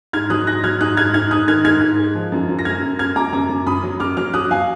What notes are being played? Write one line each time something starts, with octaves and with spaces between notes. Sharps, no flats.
G#2 F6 G#6
F#3 D#6 F#6
G#2 F#6 A#6
F#3 F6 G#6
G#2 D#6 F#6
G#2 F6 G#6
G#2 F6 G#6
G#2 D#6 F#6
D#3 F6 G#6
G#2 F6 G#6
G#2
G#3
F3
F#2
F#2
A#6
F#2 F6 G#6
F#2
F#2 F6 G#6
F#2 A#5 D6
F#2 A#5 D6
F#2
F#2 B5 D#6
F#3
F#2 D6 F6
F#3 D6 F6
F#3 D#6 F#6
F#3 F5 G#5